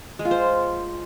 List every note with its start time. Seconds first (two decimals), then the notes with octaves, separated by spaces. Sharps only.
0.19 G#3
0.25 F4
0.31 C5